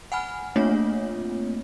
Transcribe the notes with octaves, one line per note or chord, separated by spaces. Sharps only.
F#5 G#5 B5 F6
A3 A#3 C4 D4 F4 C#5